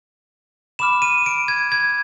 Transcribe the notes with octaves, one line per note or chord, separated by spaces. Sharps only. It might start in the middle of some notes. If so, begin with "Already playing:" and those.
B5 D6 F6 E7
D#7
D7
G#6
G#6